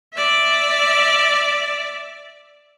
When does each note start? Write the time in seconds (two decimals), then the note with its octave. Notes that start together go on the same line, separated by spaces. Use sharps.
0.14 D5 E5